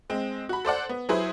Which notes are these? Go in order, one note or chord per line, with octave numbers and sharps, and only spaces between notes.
G#3 C4
F#4 B5
A4 C5 D5 F#5
B3
F#3 E4 G#4 B4 C5